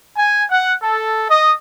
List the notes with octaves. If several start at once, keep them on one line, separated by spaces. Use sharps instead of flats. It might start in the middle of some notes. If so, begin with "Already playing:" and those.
G#5
F#5
A4
D#5